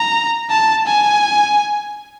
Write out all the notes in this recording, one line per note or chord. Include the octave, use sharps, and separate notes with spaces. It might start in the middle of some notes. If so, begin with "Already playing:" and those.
Already playing: A#5
A5
G#5